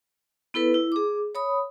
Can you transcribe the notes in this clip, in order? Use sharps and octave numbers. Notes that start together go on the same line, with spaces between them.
B3 E4 A4 B4
E4
G#4 D6
C#5 B5 D#6